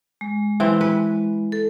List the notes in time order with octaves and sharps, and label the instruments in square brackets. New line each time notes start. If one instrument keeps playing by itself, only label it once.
[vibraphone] G#3
[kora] E3 C4
B4
[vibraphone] A4